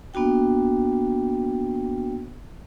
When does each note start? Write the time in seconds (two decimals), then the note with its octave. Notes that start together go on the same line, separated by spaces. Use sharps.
0.14 A#3 B3 D4 F#4 G5